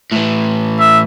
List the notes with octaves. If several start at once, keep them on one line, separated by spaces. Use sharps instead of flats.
A2 E3
E5